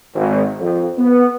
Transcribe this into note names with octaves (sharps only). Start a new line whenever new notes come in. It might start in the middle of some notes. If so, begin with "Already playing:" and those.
G#1
F2
B3